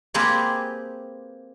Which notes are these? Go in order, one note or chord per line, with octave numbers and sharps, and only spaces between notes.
A#3 C4 G4 G#4 B4